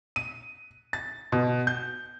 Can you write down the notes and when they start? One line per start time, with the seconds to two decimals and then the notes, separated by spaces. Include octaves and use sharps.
0.16 D#7
0.93 A6
1.32 B2
1.67 G6